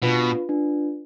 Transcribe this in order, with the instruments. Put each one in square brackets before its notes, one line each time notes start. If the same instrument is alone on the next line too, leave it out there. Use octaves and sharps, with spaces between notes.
[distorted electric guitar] B2 [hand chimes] D4 F4 B4
[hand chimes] D4 F4 B4